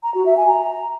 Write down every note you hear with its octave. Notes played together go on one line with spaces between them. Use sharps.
A#5
F#4
E5
G#5
A#5